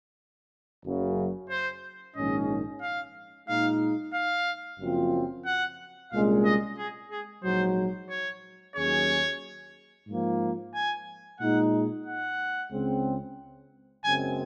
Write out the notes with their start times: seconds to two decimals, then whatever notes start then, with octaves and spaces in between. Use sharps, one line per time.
0.84 F#1 F#2 C#3
1.50 C5
2.15 A#1 G#2 D#3 G#3 C#4 D#5
2.82 F5
3.48 A#2 G#3 D#4 F5
4.14 F5
4.80 F#1 F#2 F3 C4 F4
5.46 F#5
6.11 C2 A#2 G#3 C#4 F5
6.45 D#5
6.78 G#4
7.11 G#4
7.44 A#1 G#2 F#3 C5
8.10 C#5
8.76 D#2 D#3 F#3 C#4 G#4 C#5
10.07 G#2 F3 A#3
10.74 G#5
11.40 A#2 G#3 D#4 F#5
12.06 F#5
12.72 C#2 C#3 G#3 C4
14.04 F#1 F#2 C#3 G#3 C4 G#5